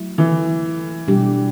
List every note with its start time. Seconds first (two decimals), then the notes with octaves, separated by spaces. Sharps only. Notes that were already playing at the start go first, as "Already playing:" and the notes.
Already playing: F#3 A3 E4
0.18 E3
1.08 B2 G3 D4 G4